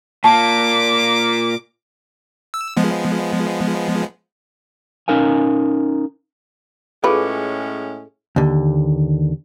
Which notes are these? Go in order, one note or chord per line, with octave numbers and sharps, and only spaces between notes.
A#2 A#3 A5 D6
E6
F3 G#3 B3
C#4 D#4 A#4 F5 G#5
A2 G#3 C#4 F4 G#4 A4 B4
D#2 D3